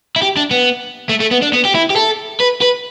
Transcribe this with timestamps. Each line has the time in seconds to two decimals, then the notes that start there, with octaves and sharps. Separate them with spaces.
0.16 E4
0.22 G4
0.37 D4
0.51 B3
1.09 A3
1.20 A3
1.31 B3
1.42 D4
1.53 B3
1.65 G4
1.75 E4
1.90 G4
1.96 A4
2.40 B4
2.62 B4